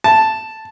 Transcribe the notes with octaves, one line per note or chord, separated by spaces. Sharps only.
A5